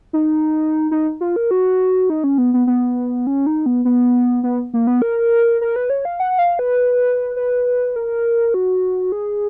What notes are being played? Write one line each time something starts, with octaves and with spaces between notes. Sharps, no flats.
D#4
D#4
F4
A#4
F#4
D#4
C#4
B3
B3
B3
C#4
D#4
B3
B3
B3
A#3
B3
A#4
A#4
B4
C#5
F5
F#5
F5
B4
B4
A#4
F#4
G#4